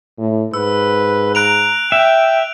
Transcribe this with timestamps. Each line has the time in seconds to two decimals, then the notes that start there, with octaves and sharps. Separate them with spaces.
0.18 A2
0.54 G#2 B4 E6
1.35 A#5 F#6 D7 F7
1.92 E5 G5